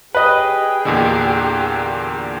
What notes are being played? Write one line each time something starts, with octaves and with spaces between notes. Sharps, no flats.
G4 G#4 B4 D#5 G5
E2 A#2 D3